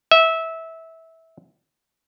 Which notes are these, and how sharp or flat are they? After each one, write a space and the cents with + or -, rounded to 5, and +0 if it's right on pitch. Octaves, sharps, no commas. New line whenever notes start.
E5 -20